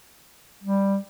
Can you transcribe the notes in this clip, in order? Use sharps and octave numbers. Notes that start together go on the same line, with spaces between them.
G3